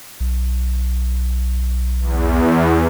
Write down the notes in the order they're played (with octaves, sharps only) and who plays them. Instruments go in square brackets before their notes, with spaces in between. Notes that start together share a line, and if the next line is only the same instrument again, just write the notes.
[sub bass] B1
[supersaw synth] E2